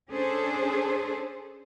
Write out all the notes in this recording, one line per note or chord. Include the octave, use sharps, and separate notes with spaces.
C#4 D4 G#4 A4 C5